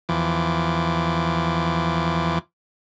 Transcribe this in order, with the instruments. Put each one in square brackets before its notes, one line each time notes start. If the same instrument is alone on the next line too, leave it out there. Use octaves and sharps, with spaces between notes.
[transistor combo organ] E2 E3 F3 D6